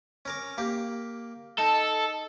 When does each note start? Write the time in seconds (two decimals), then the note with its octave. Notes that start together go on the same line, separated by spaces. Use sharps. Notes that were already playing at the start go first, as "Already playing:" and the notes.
0.25 C#4 A#4 D6
0.58 A#3 G4
1.59 D#4 A4